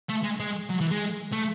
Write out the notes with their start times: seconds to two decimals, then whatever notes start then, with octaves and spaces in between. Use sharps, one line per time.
0.10 A3
0.24 G#3
0.40 G#3
0.70 F#3
0.81 E3
0.91 G#3
1.33 A3